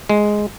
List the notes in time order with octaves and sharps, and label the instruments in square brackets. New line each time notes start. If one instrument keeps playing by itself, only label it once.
[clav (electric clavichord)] G#3